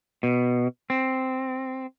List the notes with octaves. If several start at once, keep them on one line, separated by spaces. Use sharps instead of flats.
B2
C4